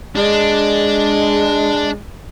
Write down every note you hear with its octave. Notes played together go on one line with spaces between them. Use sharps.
G#3 D4